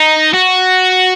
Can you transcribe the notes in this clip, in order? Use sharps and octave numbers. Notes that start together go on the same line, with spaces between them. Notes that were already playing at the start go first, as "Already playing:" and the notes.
Already playing: D#4
F#4